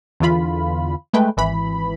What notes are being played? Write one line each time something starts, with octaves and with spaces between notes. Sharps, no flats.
E2 D3 E3 F4 B5
G#3 A3 B4 G5
G#1 E3 B5